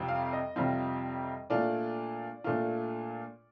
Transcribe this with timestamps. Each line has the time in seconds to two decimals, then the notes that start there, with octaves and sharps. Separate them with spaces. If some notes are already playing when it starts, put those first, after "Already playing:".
Already playing: F2 C3 G3 C4 F4
0.08 F5
0.33 D#5
0.56 F2 C3 G3 C4 F4
1.50 A#2 A3 D4 F4 D5
2.44 A#2 A3 D4 F4